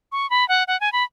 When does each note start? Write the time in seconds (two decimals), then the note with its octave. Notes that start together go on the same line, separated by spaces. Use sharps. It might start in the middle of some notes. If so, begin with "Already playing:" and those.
0.12 C#6
0.30 B5
0.49 F#5
0.68 F#5
0.81 G#5
0.93 B5